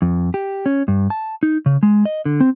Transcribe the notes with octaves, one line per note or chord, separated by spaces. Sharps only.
F2
G4
C#4
G2
A5
D#4
C#3
G#3
D#5
D3
C4